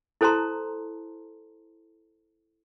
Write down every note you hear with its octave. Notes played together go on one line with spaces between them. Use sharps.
E4 A4 C5 A5 A#5 C6